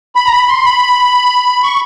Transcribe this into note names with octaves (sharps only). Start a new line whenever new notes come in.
B5
A#5
B5
C6
B5
C#6